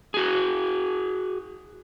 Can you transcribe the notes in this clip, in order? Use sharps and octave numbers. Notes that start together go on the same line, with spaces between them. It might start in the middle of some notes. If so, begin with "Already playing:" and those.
F#4 G#4